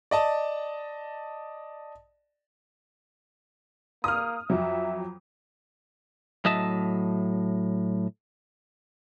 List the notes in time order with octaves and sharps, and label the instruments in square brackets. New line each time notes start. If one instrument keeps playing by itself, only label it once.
[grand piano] D5 D#5 A5
[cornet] A#3 [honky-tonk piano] D#6 F6
[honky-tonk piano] F2 F#3 [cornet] E5
[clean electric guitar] A2 F#3 D#5 E5 A5